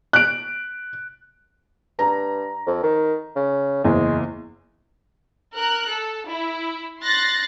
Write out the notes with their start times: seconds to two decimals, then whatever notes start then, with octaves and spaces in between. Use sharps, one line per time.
0.13 F#6 D7
1.99 G2 A#5
2.67 F2
2.83 D#3
3.36 C#3
3.84 F#1 E2 G#3
5.55 A#4 F#6
5.91 A4
6.29 E4
7.02 C6 F#6 A6 A#6